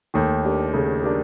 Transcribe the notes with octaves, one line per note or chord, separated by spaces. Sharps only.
D#2 D#3 A3
D4 G4 A#4
C#3 A3
D4 G4 A#4